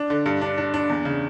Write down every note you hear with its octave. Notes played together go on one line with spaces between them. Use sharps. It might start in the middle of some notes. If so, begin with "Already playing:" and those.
Already playing: D4
D3
G2
D4
D4
D4
E2
C#3